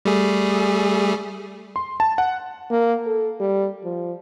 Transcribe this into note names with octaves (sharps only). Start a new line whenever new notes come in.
G3 A3 G#4
C6
A5
F#5
A#3
A4
G3
F3